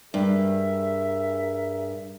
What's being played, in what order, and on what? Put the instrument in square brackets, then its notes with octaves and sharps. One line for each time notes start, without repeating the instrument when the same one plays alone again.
[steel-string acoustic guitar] G2 [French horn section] G#4 A#4 [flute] E5